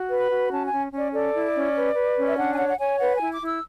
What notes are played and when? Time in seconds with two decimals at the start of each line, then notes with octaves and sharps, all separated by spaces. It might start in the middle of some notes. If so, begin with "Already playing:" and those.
Already playing: F#4
0.09 B4
0.20 B5
0.30 F#4
0.51 C#4 A5
0.66 G#5
0.72 C#4
0.92 C#4
0.97 D5
1.13 A4 D5
1.33 E4
1.54 C#4
1.75 B4
1.95 B4
2.16 C#4
2.27 E5
2.37 D4 F#5
2.53 G#5
2.58 C#5 F#5
2.68 F#5
2.79 C#5 G#5
2.99 B4 F#5
3.15 G#5
3.20 E4
3.31 D6
3.41 E4
3.46 E6